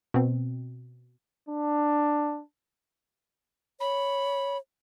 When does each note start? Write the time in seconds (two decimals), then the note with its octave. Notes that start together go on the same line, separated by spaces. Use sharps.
0.14 B2 C4
1.49 D4
3.80 C#5 B5